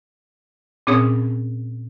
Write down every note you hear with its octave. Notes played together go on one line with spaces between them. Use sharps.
A#2 C4 C#4 G#4 C#5 D#6